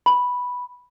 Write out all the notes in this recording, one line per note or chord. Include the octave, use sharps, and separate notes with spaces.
B5